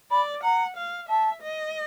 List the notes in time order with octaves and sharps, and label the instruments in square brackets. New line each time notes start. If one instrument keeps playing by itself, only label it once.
[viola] D5 [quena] B5
[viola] F#5 [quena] A#5
[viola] F5
[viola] E5 [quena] A5
[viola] D#5